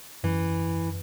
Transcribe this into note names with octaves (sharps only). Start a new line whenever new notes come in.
F#2 E3